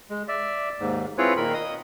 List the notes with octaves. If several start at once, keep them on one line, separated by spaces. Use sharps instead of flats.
G#3
D5 E5
D#2 G#2
C4 E4 F4 G#4 B4 C#5
A#2 D#3 A#4 B5
D#5 D#6